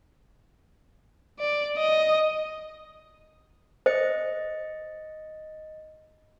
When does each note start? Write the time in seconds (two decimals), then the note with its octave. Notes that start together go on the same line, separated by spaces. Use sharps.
1.40 D5
1.77 D#5
3.86 C5 D#5 A6 C#7